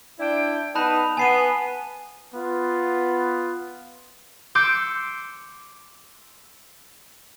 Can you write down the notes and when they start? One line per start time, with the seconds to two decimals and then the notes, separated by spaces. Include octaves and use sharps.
0.20 D4 E4 G5
0.75 B3 D#4 B4 A5 B5 F#6
1.17 B3 G#5 C7 D#7
2.34 B3 F4
4.55 C6 D6 E6 G6 C#7 D7